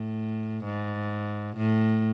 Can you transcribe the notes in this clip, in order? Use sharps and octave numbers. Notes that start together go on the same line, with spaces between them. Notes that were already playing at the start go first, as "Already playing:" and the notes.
Already playing: A2
G#2
A2